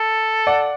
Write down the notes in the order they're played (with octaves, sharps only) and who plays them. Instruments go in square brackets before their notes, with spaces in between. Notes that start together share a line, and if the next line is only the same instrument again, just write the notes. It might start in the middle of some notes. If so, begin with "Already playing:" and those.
Already playing: [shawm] A4
[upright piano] D5 F#5